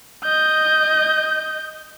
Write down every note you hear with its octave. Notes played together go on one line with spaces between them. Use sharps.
D#5 G6